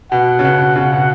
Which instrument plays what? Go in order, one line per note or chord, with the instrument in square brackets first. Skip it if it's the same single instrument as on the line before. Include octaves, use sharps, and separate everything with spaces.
[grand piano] B2 [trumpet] F#5
[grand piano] C#3
B2
C#3
B2